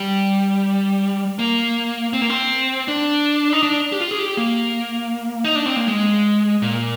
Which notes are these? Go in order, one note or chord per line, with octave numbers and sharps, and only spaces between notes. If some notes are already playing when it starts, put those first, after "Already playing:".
Already playing: G3
A#3
C4
A#3
C4
D4
D#4
D4
G4
F4
G#4
G4
A#3
D#4
D4
C4
A#3
G#3
A#2